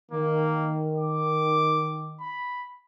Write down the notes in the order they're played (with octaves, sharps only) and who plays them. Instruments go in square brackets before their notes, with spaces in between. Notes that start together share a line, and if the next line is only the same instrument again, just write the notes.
[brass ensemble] D#3 [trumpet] A#3
[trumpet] D6
B5